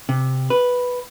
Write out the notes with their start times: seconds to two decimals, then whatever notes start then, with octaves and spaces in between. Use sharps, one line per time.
0.09 C3
0.50 B4